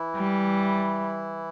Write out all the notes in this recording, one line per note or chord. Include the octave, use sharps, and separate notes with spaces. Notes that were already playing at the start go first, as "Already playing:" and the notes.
Already playing: E3 E4
G3